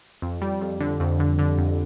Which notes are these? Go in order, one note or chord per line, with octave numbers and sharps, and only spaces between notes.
F2
G3
F2
D3
F2
D3
D3
F2